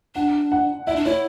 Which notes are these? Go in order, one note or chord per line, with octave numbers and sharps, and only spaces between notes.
D4 F#5
F#5
E4 E5
D4
E4 C#5